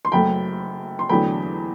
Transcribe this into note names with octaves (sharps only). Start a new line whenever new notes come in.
C6
F#1 F#2 F#3 A3 G5 B5
C6
E2 D3 F#3 A3 G5 B5